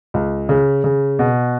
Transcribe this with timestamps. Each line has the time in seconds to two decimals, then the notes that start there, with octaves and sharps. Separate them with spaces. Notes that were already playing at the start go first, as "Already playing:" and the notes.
0.14 C#2
0.49 C#3
0.84 C#3
1.19 B2